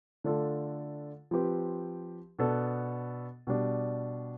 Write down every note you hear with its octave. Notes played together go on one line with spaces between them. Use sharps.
D3 A3 D4 F4 A4
F3 C4 G4 B4
B2 B3 D4 A4
B2 G3 D4